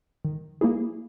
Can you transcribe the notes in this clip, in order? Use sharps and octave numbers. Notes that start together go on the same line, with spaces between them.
D#3
A#3 E4 G#4